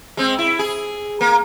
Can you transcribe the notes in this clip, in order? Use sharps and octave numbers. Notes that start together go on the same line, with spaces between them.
G#3 C4
E4
G#4
A#3